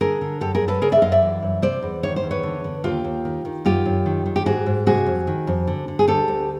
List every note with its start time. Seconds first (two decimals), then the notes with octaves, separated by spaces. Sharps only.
0.01 D3 G#4 A#4
0.21 D3
0.41 F#2 G4 A4
0.55 G#4 A#4
0.61 F#2
0.68 A4 B4
0.82 C#3 G#4 A#4
0.92 D5 E5
1.02 F#2 D#5 F5
1.12 D5 E5
1.22 E3
1.43 F#2
1.62 C3 C5 D5
1.83 E2
2.03 D#3 C#5
2.16 C5
2.23 E2
2.31 B4 C#5
2.43 D3
2.64 D3
2.84 D#2 F4 G4
3.04 D#2
3.25 D#3
3.45 D#3
3.65 F#2 F4 G4
3.86 F#2
4.06 D#3
4.26 D#3
4.36 G4
4.46 G#2 F#4 G#4
4.66 G#2
4.86 C3 F#4 G#4
5.06 F2
5.27 D#3
5.47 F2
5.67 D3
5.88 D3
5.99 G#4
6.08 D2 G4 A4
6.28 D2